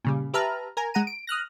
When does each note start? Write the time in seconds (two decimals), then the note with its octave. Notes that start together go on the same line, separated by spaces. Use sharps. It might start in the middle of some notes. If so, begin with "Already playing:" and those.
0.04 A#2 C#3 G3
0.34 G4 B4 E5 A5 A#5 F6
0.77 A#4 G#5 A#5
0.94 G#3 F#5 A#5 D#7
1.07 D7
1.27 D#6 F6 F#6 A#6